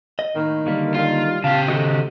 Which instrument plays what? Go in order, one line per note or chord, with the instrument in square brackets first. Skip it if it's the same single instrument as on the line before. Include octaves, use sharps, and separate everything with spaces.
[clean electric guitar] D#5
[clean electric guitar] A2 A#3 [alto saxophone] D#3
[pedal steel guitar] D3 A#3 [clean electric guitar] F#3 G3
[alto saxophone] D#3 [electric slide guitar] F4
[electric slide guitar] C#3 G4 [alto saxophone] F5 [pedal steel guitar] A5
[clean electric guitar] D#3 F#4 [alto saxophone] A3 [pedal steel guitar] D#5 F#5 C6